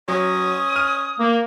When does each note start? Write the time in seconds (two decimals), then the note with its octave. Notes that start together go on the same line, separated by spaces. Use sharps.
0.08 F#3 C#4 D#6
0.76 F6 D#7
1.19 A#3